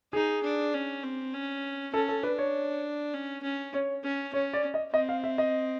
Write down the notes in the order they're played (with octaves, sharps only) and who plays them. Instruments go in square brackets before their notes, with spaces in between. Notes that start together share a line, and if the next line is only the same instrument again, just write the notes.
[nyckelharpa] D#4 [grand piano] G#4
[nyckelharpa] D4
C#4
C4
C#4
[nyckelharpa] C#4 [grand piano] A4
[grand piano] A4
[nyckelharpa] D4 [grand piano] B4
[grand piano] C#5
[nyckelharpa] C#4
C#4
[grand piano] C#5
[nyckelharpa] C#4
[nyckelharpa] C#4 [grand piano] C#5
[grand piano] D5
D#5
[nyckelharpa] C4 [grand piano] D#5
[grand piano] F5
E5
D#5